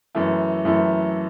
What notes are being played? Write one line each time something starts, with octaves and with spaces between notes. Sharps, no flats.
F#2 E3 A3 E4
F#2 E3 A3 E4